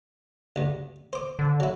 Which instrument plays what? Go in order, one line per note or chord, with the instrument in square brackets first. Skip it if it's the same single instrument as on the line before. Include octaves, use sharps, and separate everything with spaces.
[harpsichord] C#2 G2
C5 D6
[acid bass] D3
[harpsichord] F#3 E4